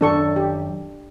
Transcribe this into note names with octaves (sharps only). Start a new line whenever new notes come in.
F#2 D#3 F#3 D4 A4 C#6
G4